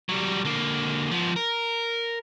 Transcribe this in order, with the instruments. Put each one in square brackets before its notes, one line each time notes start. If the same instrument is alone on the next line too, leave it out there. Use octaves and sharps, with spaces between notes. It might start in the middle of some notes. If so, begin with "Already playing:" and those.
[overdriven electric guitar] F#3 G3
D3 A#3
F3 B3
A#4